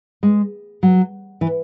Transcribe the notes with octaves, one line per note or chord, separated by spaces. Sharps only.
G#3
F#3
E3